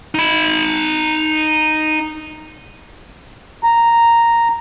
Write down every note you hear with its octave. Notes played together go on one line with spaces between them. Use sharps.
D#4 B5
A#5